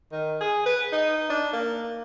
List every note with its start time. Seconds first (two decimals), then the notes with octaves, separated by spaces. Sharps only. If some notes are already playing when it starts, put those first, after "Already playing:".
0.12 D#3
0.41 G#4
0.66 B4
0.93 D#4
1.30 D4
1.53 A#3